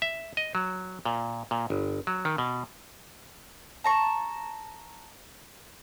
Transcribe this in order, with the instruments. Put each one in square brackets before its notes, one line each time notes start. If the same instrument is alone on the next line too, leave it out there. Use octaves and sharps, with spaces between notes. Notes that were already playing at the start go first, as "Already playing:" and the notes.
[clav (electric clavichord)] E5
D#5
F#3
A#2
A#2
G1
F#3
D#3
B2
[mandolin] A5 A#5 C#6